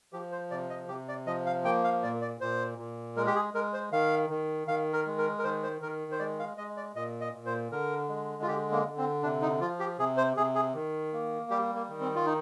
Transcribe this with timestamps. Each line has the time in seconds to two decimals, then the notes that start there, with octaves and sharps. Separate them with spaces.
0.13 F3 G4
0.32 C5
0.51 C3 D5
0.70 D#5
0.88 C3 G4
1.09 D5
1.27 F3 D#5
1.46 F5
1.64 A#3 G5
1.84 F5
2.03 A#2 D5
2.22 D5
2.41 A#2 C5
2.78 A#2
3.17 G#3 A#4
3.26 G4
3.35 G#4
3.54 G#3 A#4
3.73 C5
3.92 D#3 F5
4.30 D#3
4.68 D#3 F5
4.93 A#4
5.06 G#3
5.18 A#4
5.39 A#4
5.44 D#3 C5
5.63 C5
5.82 D#3 A#4
6.12 C5
6.19 G#3 D5
6.39 F5
6.57 G#3 D#5
6.77 D5
6.95 A#2 D#5
7.21 D#5
7.34 A#2
7.46 C5
7.71 D3 A#4
8.09 G#3
8.43 F4
8.48 D3 G4
8.72 A#3
8.85 D3
8.98 C4
9.23 C3 D4
9.42 D#4
9.61 F3 F4
9.80 G4
9.99 C3 G#4
10.17 C5
10.37 C3 G#4
10.55 G#4
10.74 D#3
11.13 A#3
11.50 G3 G4
11.75 A#3
11.89 D#3
12.00 C4
12.16 F4
12.26 D#4